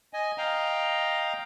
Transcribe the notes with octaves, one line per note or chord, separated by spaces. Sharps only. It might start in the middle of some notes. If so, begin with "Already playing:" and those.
D#5 G#5
D#5 F5 G5 A#5